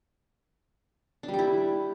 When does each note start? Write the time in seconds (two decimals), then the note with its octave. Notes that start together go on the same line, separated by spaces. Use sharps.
1.23 D4
1.28 G3
1.34 G4
1.39 E4